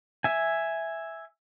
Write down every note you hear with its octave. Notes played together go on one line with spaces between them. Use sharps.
E5 G#5